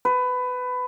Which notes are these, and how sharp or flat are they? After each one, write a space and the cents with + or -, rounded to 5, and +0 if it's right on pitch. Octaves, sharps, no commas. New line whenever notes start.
B4 +20